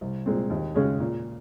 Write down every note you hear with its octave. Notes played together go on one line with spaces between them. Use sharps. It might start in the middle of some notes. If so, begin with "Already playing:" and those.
C2
A#2 G#3 C4
D#2
C#3 G#3 C#4 G#4
A#2